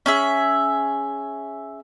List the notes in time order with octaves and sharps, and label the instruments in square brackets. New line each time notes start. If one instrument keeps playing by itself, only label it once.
[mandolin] C#4 G#4 E5